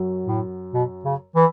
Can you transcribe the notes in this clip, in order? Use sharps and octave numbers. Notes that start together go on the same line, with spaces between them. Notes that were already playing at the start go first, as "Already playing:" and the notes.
Already playing: F#2 F#3
A2
B2
C#3
E3